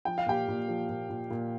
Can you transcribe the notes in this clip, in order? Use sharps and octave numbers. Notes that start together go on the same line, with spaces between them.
F3 G5
F5
A#2 G4 G5
A#2
F3
A#2
A#2
A#2